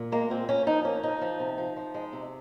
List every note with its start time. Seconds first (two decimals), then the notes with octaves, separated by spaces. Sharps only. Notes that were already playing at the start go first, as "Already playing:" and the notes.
Already playing: A#2
0.12 G#3 A#3
0.30 A#2 C4
0.49 A#3 C#4
0.67 F3 D#4
0.85 A#3 C#4
1.03 F3 D#4
1.21 F3
1.40 C3
1.58 F3
1.77 F3
1.94 G#3
2.12 C3